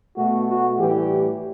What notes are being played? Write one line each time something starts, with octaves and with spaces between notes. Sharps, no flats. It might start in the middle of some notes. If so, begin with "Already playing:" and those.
B2 A3 F#4
F#4
A2 E3 G3 G4